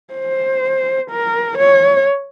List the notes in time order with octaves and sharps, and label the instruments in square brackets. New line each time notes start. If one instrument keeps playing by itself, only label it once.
[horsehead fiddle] C5
A#4
C#5